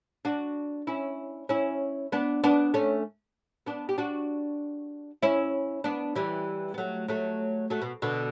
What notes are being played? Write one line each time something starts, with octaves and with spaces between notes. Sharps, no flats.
D4 F#4
C#4 E4
C#4 E4
B3 D4
B3 D4
A3 C#4
B3 D4
G4
D4 F#4
C#4 E4
B3 D4
E3 G3
B3
F#3 A3
F#3 A3
F#3 A3
B2
B2 D3